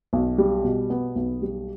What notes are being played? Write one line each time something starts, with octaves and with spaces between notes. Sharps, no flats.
B1
G3
B2
B3
B1
G3